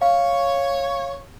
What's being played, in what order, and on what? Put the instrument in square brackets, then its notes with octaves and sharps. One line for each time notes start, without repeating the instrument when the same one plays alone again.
[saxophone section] C#5 [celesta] F5